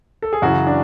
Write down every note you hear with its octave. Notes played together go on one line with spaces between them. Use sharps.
A4
G#4
F#2 C#3 E3 F#4
D4